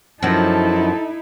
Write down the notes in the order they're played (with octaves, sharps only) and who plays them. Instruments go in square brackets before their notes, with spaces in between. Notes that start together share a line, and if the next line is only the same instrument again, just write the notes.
[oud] F#2 F3 [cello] D#4 E4 [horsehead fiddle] A4 A5